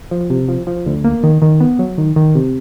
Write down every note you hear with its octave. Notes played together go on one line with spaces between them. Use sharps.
F3
C3
F3
F3
D2
A#3
D#3
D#3
B3
F#3
D#3
D#3
C3